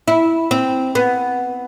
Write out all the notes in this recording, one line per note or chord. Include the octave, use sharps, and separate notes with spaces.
E4
C4
B3